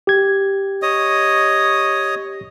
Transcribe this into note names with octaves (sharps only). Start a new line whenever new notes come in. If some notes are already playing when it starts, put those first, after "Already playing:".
G4 G#6
C#5 D#5 D#6